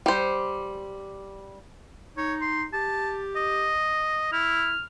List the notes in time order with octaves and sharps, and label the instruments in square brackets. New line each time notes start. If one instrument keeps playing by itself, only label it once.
[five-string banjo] G3 C5
[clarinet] D#4 [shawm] C#5
[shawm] C6
[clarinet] G4 [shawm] A5
[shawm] D#5
[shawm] E4 [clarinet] F6